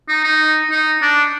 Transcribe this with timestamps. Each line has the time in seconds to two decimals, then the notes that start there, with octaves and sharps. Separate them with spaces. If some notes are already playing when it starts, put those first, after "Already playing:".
0.09 D#4
0.24 D#4
0.71 D#4
1.02 D4